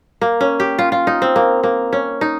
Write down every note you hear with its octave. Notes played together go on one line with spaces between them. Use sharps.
A#3
C#4
G4
F4
F4
D#4
C4
A#3
A#3
C#4
D#4